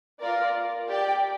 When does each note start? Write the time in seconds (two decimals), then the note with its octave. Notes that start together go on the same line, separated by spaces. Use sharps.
0.21 F4 A#4 D5
0.88 G4 D5 G5